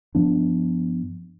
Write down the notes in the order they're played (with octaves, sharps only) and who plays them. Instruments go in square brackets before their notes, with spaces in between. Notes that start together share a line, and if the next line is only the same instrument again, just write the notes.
[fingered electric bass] G2 F3 B3 D4